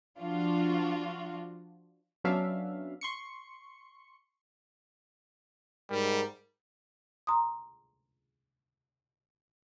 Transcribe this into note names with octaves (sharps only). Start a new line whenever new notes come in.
F3 D4 F4 F#4
F#3 B3 C#4 D4 E5 F5
C6 C#6 C#7
G#2 G3 A#4
A#5 C6 D#6